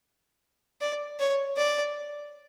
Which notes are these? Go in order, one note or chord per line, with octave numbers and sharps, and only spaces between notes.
D5
C#5
D5